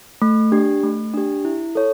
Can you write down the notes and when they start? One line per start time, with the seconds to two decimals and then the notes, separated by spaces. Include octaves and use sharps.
0.22 A3
0.52 D4 G4
0.83 A3
1.14 D4 G4
1.45 E4
1.75 A4 C#5